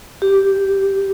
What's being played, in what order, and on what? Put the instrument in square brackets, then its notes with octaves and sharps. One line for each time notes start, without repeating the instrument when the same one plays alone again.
[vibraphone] G4